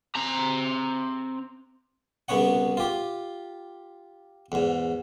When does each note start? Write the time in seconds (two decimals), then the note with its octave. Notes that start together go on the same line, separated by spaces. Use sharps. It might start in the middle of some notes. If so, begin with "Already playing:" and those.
0.16 C4 A#5
2.28 C2 C#3 B3 C#5 F#5
2.77 F4 G4
4.52 E2 G#2